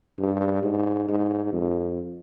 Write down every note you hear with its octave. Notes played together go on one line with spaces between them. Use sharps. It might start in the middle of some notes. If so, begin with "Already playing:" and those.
G2
G#2
G#2
F2